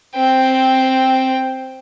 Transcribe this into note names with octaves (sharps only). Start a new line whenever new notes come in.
C4 G5